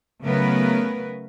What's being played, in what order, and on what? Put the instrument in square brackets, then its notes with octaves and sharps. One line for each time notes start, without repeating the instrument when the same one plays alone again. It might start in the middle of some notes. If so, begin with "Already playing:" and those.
[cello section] C#3 F#3 A3 B3 A#4 B4